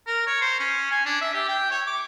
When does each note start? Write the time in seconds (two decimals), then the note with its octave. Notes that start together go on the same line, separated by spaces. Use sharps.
0.07 A#4
0.27 C#5
0.41 C5
0.59 C#4
0.91 G#5
1.06 D4
1.21 E5
1.34 G4
1.48 G5
1.71 C#5
1.87 D6